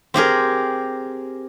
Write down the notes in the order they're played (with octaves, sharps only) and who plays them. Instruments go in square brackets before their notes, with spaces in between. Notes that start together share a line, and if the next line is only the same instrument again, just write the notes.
[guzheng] C4 G4 G#4 A#4